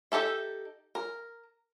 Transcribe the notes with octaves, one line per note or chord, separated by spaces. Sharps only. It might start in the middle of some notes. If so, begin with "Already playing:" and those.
D#4 G4 A4 E5
A#4